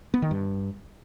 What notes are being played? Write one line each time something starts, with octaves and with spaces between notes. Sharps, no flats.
B3
D#3
G2